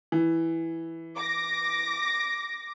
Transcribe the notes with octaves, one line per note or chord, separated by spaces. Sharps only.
E3
D6 A#6